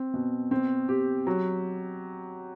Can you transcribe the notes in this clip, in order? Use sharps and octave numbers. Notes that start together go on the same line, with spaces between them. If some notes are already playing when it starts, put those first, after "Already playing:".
Already playing: C4
B2
C4
G4
F#3